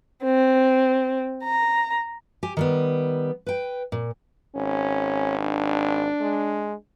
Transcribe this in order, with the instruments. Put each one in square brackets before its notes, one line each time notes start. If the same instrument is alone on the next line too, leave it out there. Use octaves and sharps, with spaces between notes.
[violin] C4
A#5
[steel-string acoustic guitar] G4 G#5
D#3 G3 B3
B4 G5
A#2
[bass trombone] G#1 [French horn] C#4
[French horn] D4
[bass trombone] G#3